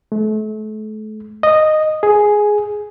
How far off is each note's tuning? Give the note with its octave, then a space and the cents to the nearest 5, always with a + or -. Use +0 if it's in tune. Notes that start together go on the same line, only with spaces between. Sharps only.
A3 -35
D#5 -10
G#4 +5